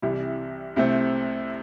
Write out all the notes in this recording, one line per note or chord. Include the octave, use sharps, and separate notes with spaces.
C2 C3 E3 G3 E4
C2 C3 A3 C4